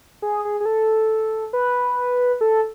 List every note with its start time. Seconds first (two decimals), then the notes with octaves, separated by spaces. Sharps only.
0.22 G#4
0.45 G#4
0.60 G#4
0.66 A4
1.53 B4
2.41 A4